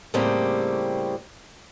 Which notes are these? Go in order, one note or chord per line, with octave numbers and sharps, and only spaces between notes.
A2 C#3 G3 A#3 C4 G4